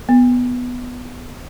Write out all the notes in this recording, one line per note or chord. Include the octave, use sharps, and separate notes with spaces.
B3